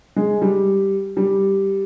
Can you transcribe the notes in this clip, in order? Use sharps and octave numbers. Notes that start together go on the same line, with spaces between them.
G#3
G3
G3